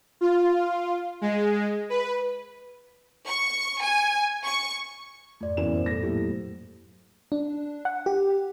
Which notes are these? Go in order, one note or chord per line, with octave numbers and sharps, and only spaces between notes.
F4
G#3
B4
C#6
G#5
C#6
F2 G#2 A3 D5
F#1 E3 B3 E7
A#2 C5
F#3 A3 A4 A#6
A2 F#3 A#3 G4
D4
F#5
G4